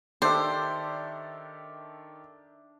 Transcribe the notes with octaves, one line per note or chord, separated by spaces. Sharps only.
D#3 D4 G4 A4 C5 E5